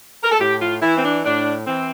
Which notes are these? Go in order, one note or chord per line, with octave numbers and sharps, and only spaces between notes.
A#4
A4
A2 G4
F4
E3 E4
C4
D4
A2 D4
E3 C4